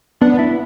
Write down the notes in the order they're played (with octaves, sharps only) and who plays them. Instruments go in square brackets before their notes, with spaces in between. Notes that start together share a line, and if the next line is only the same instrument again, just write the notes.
[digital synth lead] B3 [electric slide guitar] D4
[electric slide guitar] E4